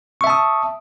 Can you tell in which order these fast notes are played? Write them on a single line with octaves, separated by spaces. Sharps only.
C#6 E5 A5 D#6